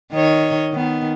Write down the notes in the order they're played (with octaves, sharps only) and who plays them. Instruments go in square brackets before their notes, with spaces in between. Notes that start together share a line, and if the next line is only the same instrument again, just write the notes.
[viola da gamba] D#3 C#5 D#5
D#3 B3